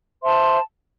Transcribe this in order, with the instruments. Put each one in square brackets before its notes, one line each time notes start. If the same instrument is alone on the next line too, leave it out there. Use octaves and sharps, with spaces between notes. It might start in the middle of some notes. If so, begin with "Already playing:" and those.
[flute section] C5 E5 A5 C6